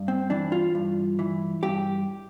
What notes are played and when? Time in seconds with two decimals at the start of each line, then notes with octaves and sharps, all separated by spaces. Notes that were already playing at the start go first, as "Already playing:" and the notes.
Already playing: G2
0.08 C4
0.30 E3 D4
0.52 F4
0.75 G2
1.19 E3
1.63 G2 G4